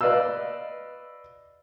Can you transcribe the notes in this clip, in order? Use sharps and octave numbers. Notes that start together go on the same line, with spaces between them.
B4 D5 D#5 F5 E6